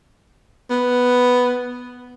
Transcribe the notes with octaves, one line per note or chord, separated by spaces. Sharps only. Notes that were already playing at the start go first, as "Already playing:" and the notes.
B3